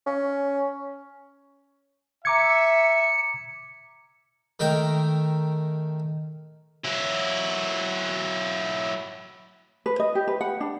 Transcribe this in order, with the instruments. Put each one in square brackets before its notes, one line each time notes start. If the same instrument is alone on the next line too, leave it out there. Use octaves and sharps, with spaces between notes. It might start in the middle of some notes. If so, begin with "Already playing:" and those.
[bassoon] C#4
[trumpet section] E5 [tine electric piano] A#5 D6 G#6 [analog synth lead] C#7
[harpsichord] D#3 A3 A#4 G5
[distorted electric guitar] F#3 E4
[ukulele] B4
D#5
G4
B4
F#5
D4